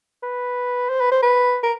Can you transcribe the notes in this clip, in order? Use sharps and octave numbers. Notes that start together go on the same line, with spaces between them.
B4
C5
B4
C5
B4
A#4